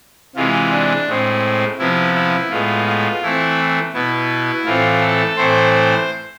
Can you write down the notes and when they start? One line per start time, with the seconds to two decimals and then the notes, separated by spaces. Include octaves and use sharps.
0.36 C3 E3 G#3 F4
0.71 D4
1.07 A2 G#3 C4
1.78 C3 F3 B3 E4
2.14 E4
2.50 A2 G#3 B3 F4
2.86 F4
3.22 E3 A3 C4 E4
3.93 B2 B3 E4
4.65 A2 E3 A3 C4 F4
5.00 A4
5.36 A2 E3 A3 C4 C5
5.73 C5